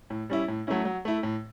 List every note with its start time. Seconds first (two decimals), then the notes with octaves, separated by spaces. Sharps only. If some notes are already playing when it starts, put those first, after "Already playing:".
0.10 A2
0.30 G3 C#4 E4
0.48 A2
0.67 F#3 A3 C#4 E4
0.85 F#3
1.05 A3 E4
1.23 A2